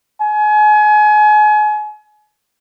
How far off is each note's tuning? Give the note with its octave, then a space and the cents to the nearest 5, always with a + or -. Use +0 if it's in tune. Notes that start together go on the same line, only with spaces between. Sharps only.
G#5 +35